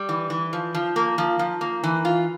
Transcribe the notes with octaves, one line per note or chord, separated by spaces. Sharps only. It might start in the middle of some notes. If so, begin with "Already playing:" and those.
Already playing: G3
E3
E3
F3
F3
A#3
F3
F3
A#3
E3
F4